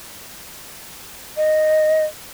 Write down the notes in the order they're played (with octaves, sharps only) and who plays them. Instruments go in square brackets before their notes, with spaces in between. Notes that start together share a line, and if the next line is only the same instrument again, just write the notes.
[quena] D#5